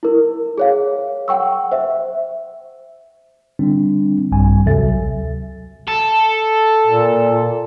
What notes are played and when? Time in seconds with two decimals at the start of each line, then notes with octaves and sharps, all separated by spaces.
0.03 E4 A#4
0.58 G#4 C#5 F5
1.28 F#5 G5 C#6 E6
1.72 C5 E5
3.59 D3 G3 C4 D4
4.31 A#1 G2 G3 G#5
4.66 D2 C3 F#3 A4 E5 A6
5.88 A4
6.87 A#2